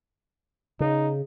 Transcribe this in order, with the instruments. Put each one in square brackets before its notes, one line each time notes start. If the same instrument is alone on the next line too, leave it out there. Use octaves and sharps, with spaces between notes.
[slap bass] C#3 [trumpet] D#4